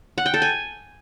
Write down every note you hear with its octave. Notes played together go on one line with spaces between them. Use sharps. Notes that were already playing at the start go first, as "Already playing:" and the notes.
F#5
G5
A4
G#5